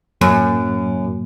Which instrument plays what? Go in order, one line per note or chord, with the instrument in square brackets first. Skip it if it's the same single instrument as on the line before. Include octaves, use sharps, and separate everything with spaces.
[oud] F#2 [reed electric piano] A2 F#3 A#3